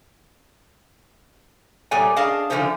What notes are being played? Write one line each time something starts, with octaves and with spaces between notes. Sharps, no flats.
A#2 G3 A3 B3 C#5 G#5
C#4 D4 G#4 D#5 F5 A5
D3 F3 A3 C#4 C5